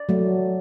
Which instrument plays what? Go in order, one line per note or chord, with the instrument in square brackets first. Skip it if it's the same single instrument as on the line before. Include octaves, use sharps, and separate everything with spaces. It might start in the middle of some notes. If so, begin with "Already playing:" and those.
Already playing: [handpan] D5
F#3 A3